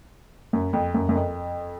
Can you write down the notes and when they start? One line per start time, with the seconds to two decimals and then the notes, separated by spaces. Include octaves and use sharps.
0.53 F#2
0.73 F2
0.94 F#2
1.09 F#2
1.15 F2